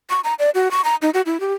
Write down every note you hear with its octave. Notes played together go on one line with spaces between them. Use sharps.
C#6
A#5
D5
F#4
C#6
A#5
D#4
F#4
E4
G4